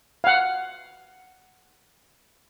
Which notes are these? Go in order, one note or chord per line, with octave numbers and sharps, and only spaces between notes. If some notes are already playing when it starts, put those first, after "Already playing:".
F5 F#5